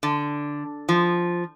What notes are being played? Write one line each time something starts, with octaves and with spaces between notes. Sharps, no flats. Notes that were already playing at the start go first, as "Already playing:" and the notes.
D3
F3